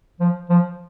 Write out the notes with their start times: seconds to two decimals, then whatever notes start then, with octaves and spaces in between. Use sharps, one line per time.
0.20 F3
0.49 F3